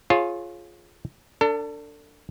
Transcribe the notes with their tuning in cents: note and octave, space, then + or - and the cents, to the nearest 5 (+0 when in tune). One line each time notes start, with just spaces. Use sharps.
F4 +0 G#4 +20 C#5 -25
D4 -10 A4 +35